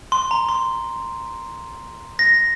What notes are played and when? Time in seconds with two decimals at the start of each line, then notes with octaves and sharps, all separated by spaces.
0.12 C6
0.31 A#5
0.49 C6
2.19 A#6